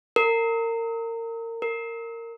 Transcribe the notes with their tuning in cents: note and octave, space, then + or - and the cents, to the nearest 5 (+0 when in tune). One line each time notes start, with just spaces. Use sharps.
A#4 -30
A#4 -20